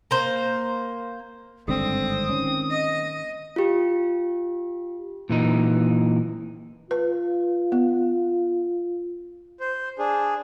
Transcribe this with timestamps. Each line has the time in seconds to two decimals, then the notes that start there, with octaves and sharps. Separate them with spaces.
0.11 A#3 C5
1.68 G#1 G2 D3 C4 D#6
2.29 D#3 C#4
2.70 D#5
3.56 F4 G4
5.30 A#2 E3 D#4
6.91 F4 B4
7.72 B3
9.60 C5
9.99 D4 G#4